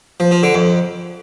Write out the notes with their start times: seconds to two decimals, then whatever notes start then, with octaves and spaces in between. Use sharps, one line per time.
0.20 F3
0.31 F3
0.43 D3
0.54 F2